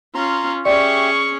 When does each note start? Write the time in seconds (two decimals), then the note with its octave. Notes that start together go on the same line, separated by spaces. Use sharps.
0.15 C#4 F4 A#5 C6
0.65 C#4 G4 G#4 D5 E5 C#6